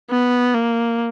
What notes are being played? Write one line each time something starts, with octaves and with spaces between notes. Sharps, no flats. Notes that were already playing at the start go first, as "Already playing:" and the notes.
B3
A#3